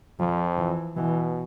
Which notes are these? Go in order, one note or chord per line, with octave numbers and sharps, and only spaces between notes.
F2 F3
E3
B2 E3